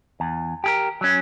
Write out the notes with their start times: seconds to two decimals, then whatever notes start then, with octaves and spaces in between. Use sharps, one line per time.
0.20 E2
0.64 G4 G#4 A#4
1.01 F#3 C#4